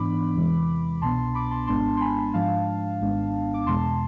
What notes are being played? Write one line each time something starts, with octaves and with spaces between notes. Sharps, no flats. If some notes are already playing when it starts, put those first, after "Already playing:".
Already playing: G#2 E3 B3 D4 B5 D6
E2 C3 E3 G#3
C2 B2 B3 D4 A5 C6
A5 C6
B5 D6
A5 C6
G#1 G#2 G#3 B3 D4 A5 C6
C6
G#5 B5
G#2 F3 G#3 D4 F5 A5
G#1 G#2 G#3 B3 D4
D6
E2 B2 G#3 A5 C6